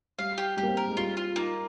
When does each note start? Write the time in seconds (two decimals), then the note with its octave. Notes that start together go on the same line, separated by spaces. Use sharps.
0.19 G3 F5
0.38 G4
0.57 G3 G4
0.63 A#3
0.68 C4
0.77 A#4
0.88 G#3
0.97 G3 F4
1.17 F4
1.36 A#3 D#4